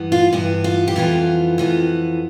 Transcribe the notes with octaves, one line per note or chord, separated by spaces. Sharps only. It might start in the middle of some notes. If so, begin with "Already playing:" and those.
Already playing: G2 E3 B3
F4
G2 E3 B3
F4
G4
F2 E3 B3 F4
F2 E3 B3